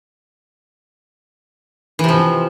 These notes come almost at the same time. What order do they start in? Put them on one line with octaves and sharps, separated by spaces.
E3 C3 F3